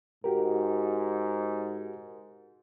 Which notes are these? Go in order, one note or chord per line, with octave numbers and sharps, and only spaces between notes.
G#2 F#4 G4 A#4